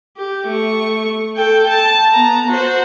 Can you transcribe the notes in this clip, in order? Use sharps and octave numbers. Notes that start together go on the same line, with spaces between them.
G4
A3 C#6
A4 G5
A5
B3 A#5
F#4 C5